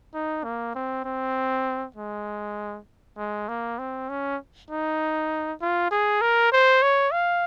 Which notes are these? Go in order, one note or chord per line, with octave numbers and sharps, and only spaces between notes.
D#4
A#3
C4
C4
G#3
G#3
A#3
C4
C#4
D#4
F4
G#4
A#4
C5
C#5
F5